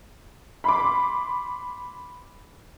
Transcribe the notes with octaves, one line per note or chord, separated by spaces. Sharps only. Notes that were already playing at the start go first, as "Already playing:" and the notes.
B5 C6 D6